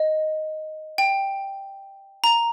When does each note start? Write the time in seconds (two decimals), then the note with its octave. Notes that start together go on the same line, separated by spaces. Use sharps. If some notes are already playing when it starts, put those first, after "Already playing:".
Already playing: D#5
0.98 G5
2.24 A#5